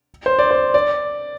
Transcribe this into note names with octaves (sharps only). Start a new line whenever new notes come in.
C5
D5
C5
D5